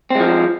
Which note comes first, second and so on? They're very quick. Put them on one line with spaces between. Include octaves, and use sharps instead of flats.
C4 G#3 F3